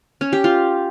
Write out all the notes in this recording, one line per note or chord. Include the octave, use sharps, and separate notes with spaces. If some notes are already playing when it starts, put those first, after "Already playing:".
C#4
G4
F4